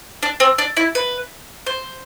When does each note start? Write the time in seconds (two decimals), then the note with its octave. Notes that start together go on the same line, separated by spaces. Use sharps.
0.23 D4
0.40 C4
0.58 D4
0.77 E4
0.95 B4
1.67 C5